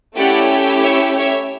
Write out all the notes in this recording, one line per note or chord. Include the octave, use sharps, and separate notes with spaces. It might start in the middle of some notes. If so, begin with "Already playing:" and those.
A3 C#4 E4 G4 D5 F#5
C#5 E5
C#5 E5